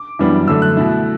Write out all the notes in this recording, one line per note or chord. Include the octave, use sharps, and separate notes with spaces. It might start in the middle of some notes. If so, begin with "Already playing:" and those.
Already playing: D6
F#2 E3 G3 B3 D4
F#2 D3 A3 E6
F#6
B2 A3 E4